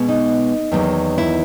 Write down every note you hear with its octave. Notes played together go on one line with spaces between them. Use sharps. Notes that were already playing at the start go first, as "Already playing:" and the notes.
Already playing: B2 G#3 B3
D#4
E2 D#3 F#3 A#3
E4